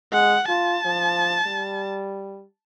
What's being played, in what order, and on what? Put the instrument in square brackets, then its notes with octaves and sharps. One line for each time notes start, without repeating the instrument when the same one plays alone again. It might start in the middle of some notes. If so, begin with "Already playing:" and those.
[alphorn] G#3 [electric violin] F#5
[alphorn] F4 [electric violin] A5
[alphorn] F3
G3